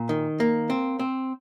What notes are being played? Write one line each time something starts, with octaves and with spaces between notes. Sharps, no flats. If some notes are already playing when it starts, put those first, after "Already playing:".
Already playing: A#2
D#3
A#3
C4
C4